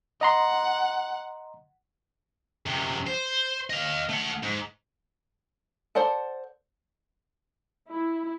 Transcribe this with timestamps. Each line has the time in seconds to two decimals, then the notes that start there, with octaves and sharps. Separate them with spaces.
0.21 D#5 F#5 A#5 C6
2.66 F#2 C3
3.07 C5
3.70 D#5 F5
4.10 A3 F#5
4.43 G#2
5.95 A4 C5 D5 F#5 A5
7.91 E4